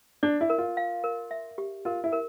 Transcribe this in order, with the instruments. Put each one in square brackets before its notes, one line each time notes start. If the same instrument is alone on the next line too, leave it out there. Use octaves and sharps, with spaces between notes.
[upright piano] D4 [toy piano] D5
[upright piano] E4
[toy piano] A#4
[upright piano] F4
[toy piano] F5
A#4
E5
G4
[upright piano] F4 [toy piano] A#4
[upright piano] E4
[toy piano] A#4